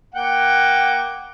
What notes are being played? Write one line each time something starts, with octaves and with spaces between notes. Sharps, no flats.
A#3 F#5 G5